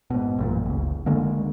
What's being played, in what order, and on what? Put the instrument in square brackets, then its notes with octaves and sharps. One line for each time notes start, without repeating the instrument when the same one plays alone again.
[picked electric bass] G#2 B2
A1 F#2 A#2
F#1 C#2
D2 D3 G#3 A#3